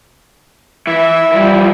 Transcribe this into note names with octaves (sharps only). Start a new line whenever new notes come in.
E3 E5
E3 F3 G3